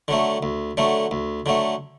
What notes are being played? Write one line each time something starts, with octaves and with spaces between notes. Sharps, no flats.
D3 F#3 A3
D2
D3 F#3 A3
D2
D3 F#3 A3